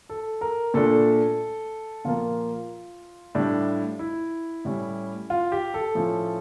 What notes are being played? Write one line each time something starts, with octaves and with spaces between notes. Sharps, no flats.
A4
A#4
A#2 A3 D4 A4
A#2 F3 A#3 F4
A2 G3 D4
E4
A2 G3 C#4
F4
G4
A4
A2 F3 C#4